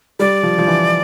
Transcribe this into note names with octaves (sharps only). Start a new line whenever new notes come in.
G3 D5
F3
F3
E3